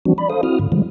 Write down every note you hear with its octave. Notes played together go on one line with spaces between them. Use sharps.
E3 F3 G3 C4 D4 F#4
D5 B5
A4 C5 F5 D#6
C4 E4 F#4 D#6 F6
G#2 D3
D3 E3 F3 G3 G#3